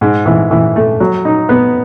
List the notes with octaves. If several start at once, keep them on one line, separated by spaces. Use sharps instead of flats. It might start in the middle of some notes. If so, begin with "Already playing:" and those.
G#2
E3
E3
A3
F#3
D#4
B3